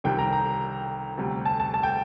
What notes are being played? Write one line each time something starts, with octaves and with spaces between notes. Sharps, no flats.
C2 C3 D#3 G3 G5
A#5
A#5
D2 C3 G3
A5
A5
A5
G5